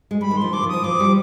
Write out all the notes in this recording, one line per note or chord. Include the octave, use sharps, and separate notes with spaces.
G#3
G3 B5
D#3
F3 C6
D#3 D6
F3
D#6
F3
F3 D6
G3